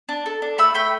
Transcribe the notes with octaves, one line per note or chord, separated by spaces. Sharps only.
D4
A4
D4
A3 B5 E6
A3 G5 B5